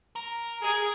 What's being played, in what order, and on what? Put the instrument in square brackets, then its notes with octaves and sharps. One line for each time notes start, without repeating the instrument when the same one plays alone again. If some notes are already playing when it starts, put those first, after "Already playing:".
[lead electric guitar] A#4
[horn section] G#4